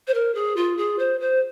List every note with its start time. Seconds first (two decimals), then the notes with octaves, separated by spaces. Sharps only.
0.07 C5
0.14 A#4
0.35 G#4
0.56 F4
0.77 G#4
0.99 C5
1.20 C5